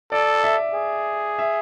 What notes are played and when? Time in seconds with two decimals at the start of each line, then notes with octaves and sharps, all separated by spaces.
0.12 A4 D5
0.44 E5
0.74 G#4
1.39 E5